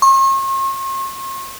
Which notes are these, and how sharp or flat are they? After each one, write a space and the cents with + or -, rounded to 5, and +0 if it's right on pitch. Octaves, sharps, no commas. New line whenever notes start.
C#6 -45